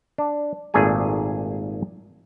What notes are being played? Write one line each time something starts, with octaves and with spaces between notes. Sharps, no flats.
D4
G#1 A#2 A3 G#4 G#5